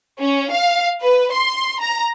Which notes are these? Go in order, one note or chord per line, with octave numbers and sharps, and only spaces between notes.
C#4
F5
B4
C6
A#5